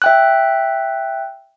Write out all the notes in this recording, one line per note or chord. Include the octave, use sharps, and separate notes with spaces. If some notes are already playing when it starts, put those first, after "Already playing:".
E5 G5 F#6